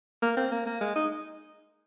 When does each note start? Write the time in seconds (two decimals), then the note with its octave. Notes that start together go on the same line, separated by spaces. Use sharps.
0.22 A#3
0.37 C4
0.52 A#3
0.66 A#3
0.81 G#3
0.96 D#4